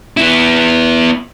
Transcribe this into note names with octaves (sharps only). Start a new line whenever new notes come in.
B3 E4